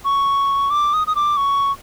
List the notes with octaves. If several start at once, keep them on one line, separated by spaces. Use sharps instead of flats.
C#6
D6
D#6
D#6
D6
C#6